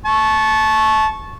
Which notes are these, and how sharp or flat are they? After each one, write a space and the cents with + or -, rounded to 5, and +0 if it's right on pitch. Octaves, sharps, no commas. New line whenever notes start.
A5 -20 C#6 -10